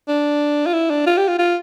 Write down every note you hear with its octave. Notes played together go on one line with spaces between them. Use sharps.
D4
F4
E4
D4
F4
G4
F4
F4